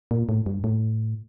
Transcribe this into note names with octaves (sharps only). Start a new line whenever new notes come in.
A#2
A2
G2
A2